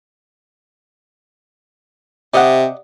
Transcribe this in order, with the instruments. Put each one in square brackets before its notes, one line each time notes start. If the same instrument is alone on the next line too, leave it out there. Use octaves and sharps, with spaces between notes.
[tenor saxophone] C3 [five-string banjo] D5 D#5 F#5